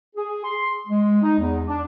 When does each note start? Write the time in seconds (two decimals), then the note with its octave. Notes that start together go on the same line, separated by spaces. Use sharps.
0.15 G#4
0.43 C6
0.87 G#3
1.22 D#4
1.38 E2
1.66 D4